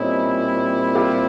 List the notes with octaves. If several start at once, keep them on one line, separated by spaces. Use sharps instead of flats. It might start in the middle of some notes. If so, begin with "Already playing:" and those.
Already playing: A#2 G3 C4 C#4 D#4 E4
F4 G4